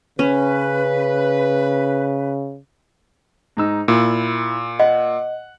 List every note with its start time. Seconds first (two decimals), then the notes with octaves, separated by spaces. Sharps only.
0.19 C#3 C#4 B4
3.57 G#2 D#4 E6
3.88 A#2 E4
4.80 D#5 F#5